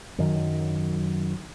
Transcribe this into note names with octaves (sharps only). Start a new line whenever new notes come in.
F#2 D#3 F#3